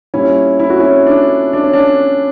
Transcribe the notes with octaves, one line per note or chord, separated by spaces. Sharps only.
A#2 G3 C#4 E4
E4
F#4
C#4 E4
D4
D4
C#4
D4